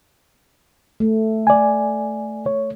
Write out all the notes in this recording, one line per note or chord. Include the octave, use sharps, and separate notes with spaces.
A3
D5 G#5
C#5